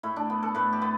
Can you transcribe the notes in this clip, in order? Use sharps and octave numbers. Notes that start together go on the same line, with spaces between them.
A2 E4
D4
B3
A4
A2 B4
G4
B3